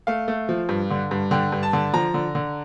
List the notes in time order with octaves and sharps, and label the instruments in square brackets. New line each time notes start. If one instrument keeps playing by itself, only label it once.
[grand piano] A3 F5
A3
F3
G2
D3
G2
D3 G5
G2
A5
D3
F3 A#5
D3
D3